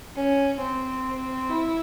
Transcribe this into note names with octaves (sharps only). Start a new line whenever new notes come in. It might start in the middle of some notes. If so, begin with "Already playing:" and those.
C#4
C4
E4